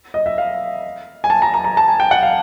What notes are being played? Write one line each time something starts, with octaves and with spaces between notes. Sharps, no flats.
D#5
E5
F5
G#5
A5
A#5
A#5
A#5
A5
G#5
G5
F#5
F5